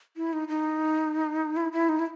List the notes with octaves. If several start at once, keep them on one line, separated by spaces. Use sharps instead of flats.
E4
D#4
D#4
E4
E4
D#4
E4